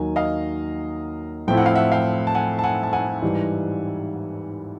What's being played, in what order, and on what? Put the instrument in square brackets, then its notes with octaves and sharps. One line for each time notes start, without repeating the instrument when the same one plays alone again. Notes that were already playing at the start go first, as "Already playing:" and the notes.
Already playing: [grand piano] D#2 D#3 F#3 [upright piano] G#5
[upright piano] D#5 F5
[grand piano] A2 F3 A3 C4 E4 [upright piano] G5
[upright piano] F#5
F5
E5 F#5
F5 G5
A5
F#5 G#5
A5
F#5 G#5
A5
F#5 G#5
[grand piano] G#2 E3 G3